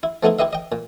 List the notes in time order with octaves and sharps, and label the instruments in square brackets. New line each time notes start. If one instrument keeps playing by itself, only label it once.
[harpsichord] E4
F3 A3 B3 D#4 E4
E4 G4 B4 D#5 E5
D#5 G5
A#2